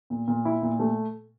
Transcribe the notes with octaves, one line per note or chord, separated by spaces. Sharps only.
A#2
A#2
E4
A#2
A3